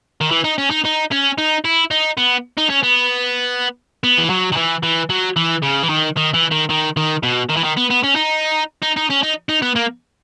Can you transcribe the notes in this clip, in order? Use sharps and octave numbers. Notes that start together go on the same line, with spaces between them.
D#3
E3
D#4
C#4
D#4
D#4
C#4
D#4
E4
D#4
B3
D#4
C#4
B3
B3
E3
F#3
D#3
E3
E3
F#3
E3
C#3
E3
D#3
D#3
E3
D#3
D#3
D#3
B2
D#3
E3
D#3
B3
B3
C#4
D#4
D#4
D#4
C#4
D#4
D#4
B3
A#3